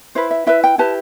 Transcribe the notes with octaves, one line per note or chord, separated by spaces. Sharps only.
E4 B4 C5
E5
E4 B4 E5
G5
E4 G4 B4 A5